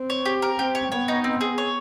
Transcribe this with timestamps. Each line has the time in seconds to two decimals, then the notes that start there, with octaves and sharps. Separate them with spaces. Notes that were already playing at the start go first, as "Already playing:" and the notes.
Already playing: C4
0.10 C#5
0.26 G4
0.42 A#4
0.59 C4 G4
0.75 C#5
0.92 B3 C#5
1.08 D#4
1.24 C4
1.41 G#4
1.58 C#5